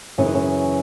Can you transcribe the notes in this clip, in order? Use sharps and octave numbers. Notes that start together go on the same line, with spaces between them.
F#2 C#3 E3 C#4
D#4
C#4